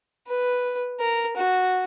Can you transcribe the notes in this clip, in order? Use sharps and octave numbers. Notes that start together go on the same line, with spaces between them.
B4
A#4
F#4